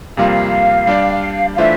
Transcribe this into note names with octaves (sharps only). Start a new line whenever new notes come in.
F2 C3 G3 A#3 F4 F5
G3 D4 G4 D5
F5
E3 A3 D4 F4 C5 E5